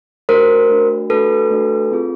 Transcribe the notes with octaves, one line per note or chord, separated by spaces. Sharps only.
A3 D4 F#4 A#4 C5
A3 D4 F#4
A3 D4 F#4 A4 B4
A3 D4 F#4
C4 F4 G#4